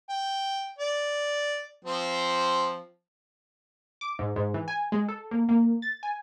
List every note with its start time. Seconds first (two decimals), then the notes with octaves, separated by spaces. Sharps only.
0.09 G5
0.78 D5
1.85 F3 C4
4.01 D6
4.19 G#2
4.36 G#2
4.54 E3
4.68 G#5
4.92 G#3
5.08 A4
5.31 A#3
5.49 A#3
5.82 A6
6.03 G#5